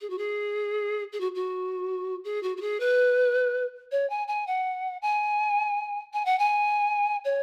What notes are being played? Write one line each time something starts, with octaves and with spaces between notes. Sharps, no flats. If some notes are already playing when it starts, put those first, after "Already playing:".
G#4
F#4
G#4
G#4
F#4
F#4
G#4
F#4
F#4
G#4
B4
C#5
G#5
G#5
F#5
G#5
G#5
F#5
G#5
C#5